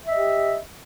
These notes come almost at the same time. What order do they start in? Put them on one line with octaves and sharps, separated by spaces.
E5 D#5 G4